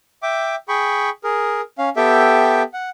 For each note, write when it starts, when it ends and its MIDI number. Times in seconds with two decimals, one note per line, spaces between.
0.23 0.56 76
0.23 0.56 79
0.23 0.56 86
0.68 1.10 68
0.68 1.10 79
0.68 1.10 83
0.68 1.10 85
1.24 1.61 68
1.24 1.61 70
1.78 1.89 61
1.78 1.89 77
1.96 2.62 59
1.96 2.62 67
1.96 2.62 69
1.96 2.62 76
1.96 2.62 79
2.74 2.90 78